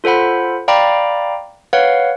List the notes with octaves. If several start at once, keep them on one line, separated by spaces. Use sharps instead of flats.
F4 A4 C5 F#5 B5
D5 F5 G5 A#5 B5 D6
B4 C#5 F5 F#5